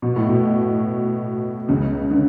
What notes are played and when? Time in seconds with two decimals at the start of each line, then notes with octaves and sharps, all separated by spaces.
0.02 B2
0.16 A2
0.29 B2
1.69 C#2 C#3
2.11 D3